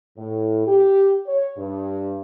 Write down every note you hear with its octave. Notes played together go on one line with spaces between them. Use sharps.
A2
G4
C#5
G2